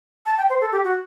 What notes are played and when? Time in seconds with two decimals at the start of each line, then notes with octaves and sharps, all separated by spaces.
0.26 A5
0.38 G5
0.50 C5
0.61 A4
0.72 G4
0.84 F#4